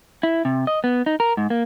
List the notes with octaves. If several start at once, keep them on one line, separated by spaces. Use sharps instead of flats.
E4
C3
D#5
B3
D#4
A#4
G#2
A#3